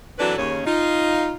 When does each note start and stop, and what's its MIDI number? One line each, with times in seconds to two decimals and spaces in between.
0.18 0.33 52
0.18 0.33 54
0.18 0.33 60
0.18 0.33 62
0.18 0.33 69
0.18 0.33 71
0.38 0.61 39
0.38 0.61 49
0.38 0.61 61
0.65 1.34 63
0.65 1.34 65